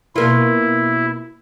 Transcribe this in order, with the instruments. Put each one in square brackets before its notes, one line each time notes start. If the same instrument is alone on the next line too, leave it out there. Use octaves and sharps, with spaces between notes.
[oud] B2 A#3 F4 [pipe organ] E4